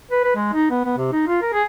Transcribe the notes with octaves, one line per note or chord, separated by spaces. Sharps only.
B4
B4
G#3
D#4
B3
B3
C3
D#4
F4
A#4
G#4